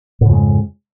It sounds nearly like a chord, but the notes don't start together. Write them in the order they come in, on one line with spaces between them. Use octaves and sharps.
G#2 C#3 F2 G#3